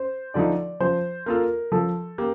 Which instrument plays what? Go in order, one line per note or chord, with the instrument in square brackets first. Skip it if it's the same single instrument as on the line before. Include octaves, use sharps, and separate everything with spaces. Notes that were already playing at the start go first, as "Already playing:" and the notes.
Already playing: [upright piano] C5
[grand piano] D3 F3 A3 D#4 [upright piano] D5
[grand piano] F3 [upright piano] C5
[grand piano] A#3 F4 A4 [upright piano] A#4
[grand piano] F3 [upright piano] A4
[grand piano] A#3 [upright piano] G4